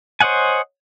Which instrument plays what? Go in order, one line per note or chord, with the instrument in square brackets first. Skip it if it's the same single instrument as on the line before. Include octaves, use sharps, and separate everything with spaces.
[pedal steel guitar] C5 C#5 D#5 F#5 G#5